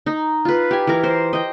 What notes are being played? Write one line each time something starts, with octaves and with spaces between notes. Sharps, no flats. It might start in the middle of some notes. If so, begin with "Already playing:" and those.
D#4
F4 B4
G4 G#5
E3 A#4
C5
D#5 G5